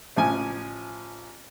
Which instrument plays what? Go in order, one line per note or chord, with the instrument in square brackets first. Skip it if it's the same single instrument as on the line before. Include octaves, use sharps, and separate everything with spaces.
[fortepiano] A1 F3 G#5